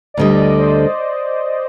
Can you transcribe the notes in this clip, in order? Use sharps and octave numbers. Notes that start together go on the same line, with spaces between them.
D5
D2 D3 G3 D#5
D5
D#5
C5
D5